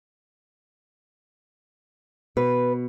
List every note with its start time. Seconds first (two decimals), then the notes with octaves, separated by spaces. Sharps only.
2.37 B2 B4